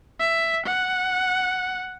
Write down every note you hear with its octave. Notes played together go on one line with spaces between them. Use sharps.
E5
F#5